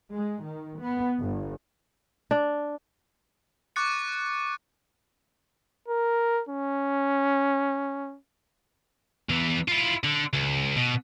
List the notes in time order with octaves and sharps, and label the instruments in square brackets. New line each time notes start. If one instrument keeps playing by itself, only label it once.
[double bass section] G#3
D#3
B3
G1
[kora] D4
[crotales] C#6 D6 F#6 A6 C#7
[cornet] A#4
C#4
[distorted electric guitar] E2 E3
E4 F4
D3
C#2
B2